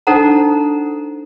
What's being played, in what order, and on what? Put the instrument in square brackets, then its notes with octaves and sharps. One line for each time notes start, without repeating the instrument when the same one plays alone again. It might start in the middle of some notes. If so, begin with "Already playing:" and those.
[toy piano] D4 D#4 A4 C5 F#5 A#5